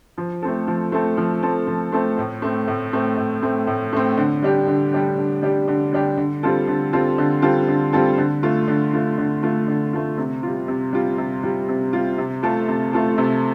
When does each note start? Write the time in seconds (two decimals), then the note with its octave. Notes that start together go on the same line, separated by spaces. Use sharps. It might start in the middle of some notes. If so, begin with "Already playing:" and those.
0.18 F3
0.42 A3 C4 A4
0.67 F3
0.92 A3 C4 A4
1.17 F3
1.42 A3 C4 A4
1.67 F3
1.92 A3 C4 A4
2.18 A2
2.42 A3 C4
2.67 A2
2.93 A3 C4
3.17 A2
3.43 A3 C4
3.67 A2
3.93 A3 C4
4.17 D3
4.42 G3 D4 G4
4.68 D3
4.93 G3 D4 G4
5.18 D3
5.42 G3 D4 G4
5.68 D3
5.93 G3 D4 G4
6.17 D3
6.43 G3 C4 F4 A4
6.68 D3
6.93 G3 C4 F4 A4
7.18 D3
7.42 G3 C4 F4 A4
7.68 D3
7.93 G3 C4 F4 A4
8.18 D3
8.43 A3 F4
8.68 D3
8.93 A3 F4
9.18 D3
9.43 A3 F4
9.68 D3
9.93 A3 F4
10.18 C3
10.43 G3 F4
10.68 C3
10.93 G3 F4
11.18 C3
11.43 G3 F4
11.68 C3
11.93 G3 F4
12.18 C3
12.43 A3 F4 A4
12.68 C3
12.93 A3 F4 A4
13.18 C3